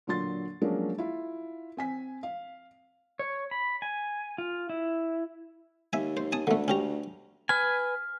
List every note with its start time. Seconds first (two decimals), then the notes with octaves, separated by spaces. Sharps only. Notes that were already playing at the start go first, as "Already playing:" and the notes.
0.07 A#2 D3 F#3 C6 A6
0.61 F3 F#3 G#3 A#3 C#4 D4
0.98 E4 F4
1.77 C4 G#5 B6
2.23 F5
3.19 C#5
3.51 B5
3.82 G#5
4.38 F4
4.69 E4
5.93 D#2 E5 G#5
6.17 C5
6.32 G#5 A5 D#6
6.47 D2 D3 A3
6.68 C#4 G4 A#5
7.49 B4 G#5 F6